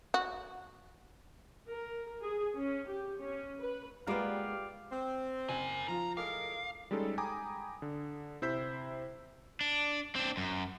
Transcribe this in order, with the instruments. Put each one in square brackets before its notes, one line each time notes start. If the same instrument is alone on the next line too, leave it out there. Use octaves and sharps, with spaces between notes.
[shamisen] F#4
[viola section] A#4
G#4
C#4
G4
C#4
B4
[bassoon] G3 [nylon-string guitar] G#3 F4 [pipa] A#3 B3 [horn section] G4 D5 F5
[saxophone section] C4
[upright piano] F#1 [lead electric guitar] A#4 G#5
[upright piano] F3 F4 [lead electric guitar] A#5
[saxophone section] A2 G#3 A#4 [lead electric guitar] F5 [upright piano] D6
[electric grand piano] G3 G#3 C#4 D#4 A4
G5 G#5 A#5 B5 D6 D#6
D3
C3 E4 C5 E6 G6 B6
[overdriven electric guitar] D4
C4 D4
F#2